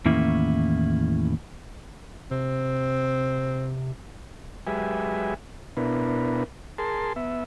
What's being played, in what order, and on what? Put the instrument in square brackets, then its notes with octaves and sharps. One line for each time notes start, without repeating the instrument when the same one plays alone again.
[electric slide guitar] E2 A2 D#3 A#3 C#4 E4
[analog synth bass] C3 [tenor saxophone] C4
[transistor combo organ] F#3 G#3 G4 B4 E5 G#5
B2 B3 D4 E4 A#4 B4
G#4 A#4 A5 C6
B3 E5